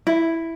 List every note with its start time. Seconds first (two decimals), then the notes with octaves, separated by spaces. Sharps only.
0.07 E4